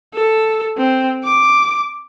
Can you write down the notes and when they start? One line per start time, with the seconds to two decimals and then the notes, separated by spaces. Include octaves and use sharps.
0.15 A4
0.78 C4
1.25 D6